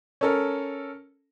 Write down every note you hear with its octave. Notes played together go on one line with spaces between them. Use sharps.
C#4 A4 A#4